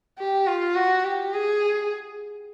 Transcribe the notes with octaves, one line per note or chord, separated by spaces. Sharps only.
G4
F4
F#4
G4
G#4